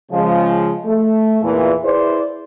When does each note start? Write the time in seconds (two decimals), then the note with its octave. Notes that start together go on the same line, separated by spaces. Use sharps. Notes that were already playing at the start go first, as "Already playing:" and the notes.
0.11 C#3 F3 G#3
0.86 A3
1.42 E2 A#2 E3
1.84 E4 G#4 B4 C5 D5